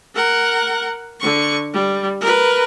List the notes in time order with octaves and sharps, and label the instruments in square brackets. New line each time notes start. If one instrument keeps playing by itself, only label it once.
[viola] A#4 F#5
D3 C#6
G3
A#4 B4